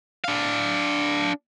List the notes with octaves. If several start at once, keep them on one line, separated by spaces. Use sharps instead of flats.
D4 F5